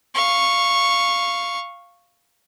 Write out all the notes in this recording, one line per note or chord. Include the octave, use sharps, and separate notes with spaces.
F5 C#6